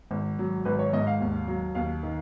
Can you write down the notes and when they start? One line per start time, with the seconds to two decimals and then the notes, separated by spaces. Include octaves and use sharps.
0.11 G#1
0.39 F#3
0.65 G#1 B4
0.79 C#5
0.93 G#2 D#5
1.07 F5
1.20 D#2
1.47 F#3
1.75 D#2 F5
2.03 D#3